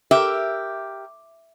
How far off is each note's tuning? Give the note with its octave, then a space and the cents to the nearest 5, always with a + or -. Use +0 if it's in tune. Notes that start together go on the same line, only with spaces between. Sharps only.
G4 +0 A#4 +0 E5 +0